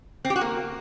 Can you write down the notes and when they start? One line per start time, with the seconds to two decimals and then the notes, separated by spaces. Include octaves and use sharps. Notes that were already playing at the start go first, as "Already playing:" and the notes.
0.25 C4
0.30 G4
0.36 F#4
0.41 A#3